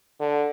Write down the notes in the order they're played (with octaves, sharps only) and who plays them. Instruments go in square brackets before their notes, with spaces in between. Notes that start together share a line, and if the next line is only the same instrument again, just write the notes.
[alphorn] D3